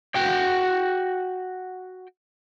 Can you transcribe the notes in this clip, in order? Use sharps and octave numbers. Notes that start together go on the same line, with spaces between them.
F#4 G5